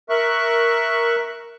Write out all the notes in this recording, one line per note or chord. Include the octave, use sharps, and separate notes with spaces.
A#4 E5 C#6 F#6